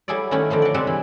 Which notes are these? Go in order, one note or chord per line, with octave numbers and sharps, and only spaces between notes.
F#3 G3 E4 G#4 A4 D5
D#3 A3 C#4 E4 B4
D3 D#3 F3 A3
F#3 D5
C3 G3 G#3 E5 F#5 A5
E3